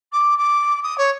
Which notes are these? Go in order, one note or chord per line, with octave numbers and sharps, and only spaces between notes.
D6
D6
D#6
C#5